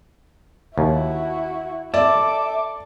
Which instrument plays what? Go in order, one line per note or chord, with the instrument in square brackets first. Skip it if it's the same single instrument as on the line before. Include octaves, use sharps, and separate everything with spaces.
[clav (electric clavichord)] D#2 [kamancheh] E4 F#4
[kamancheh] A4 D6 [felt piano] D5 [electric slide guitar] E5